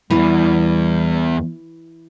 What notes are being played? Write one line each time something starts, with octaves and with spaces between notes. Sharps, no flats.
E2 G2 E3 G3